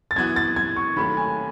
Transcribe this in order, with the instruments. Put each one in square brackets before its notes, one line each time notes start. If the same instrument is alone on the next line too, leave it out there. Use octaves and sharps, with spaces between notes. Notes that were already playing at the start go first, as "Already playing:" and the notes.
[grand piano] A6
[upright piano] F#2 E3 B3 F#4 [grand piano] G#6
[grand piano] A6
G#6
C#6
[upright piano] D#2 D#3 F#3 A3 C#4 [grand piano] B5
[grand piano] G#5